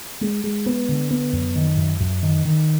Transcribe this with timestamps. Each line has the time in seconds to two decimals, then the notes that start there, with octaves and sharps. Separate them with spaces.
0.21 G#3
0.44 G#3
0.66 B3
0.89 D3
1.11 B3
1.33 F#2
1.56 D#3
1.78 F#2
2.00 F#2
2.23 D#3
2.45 D#3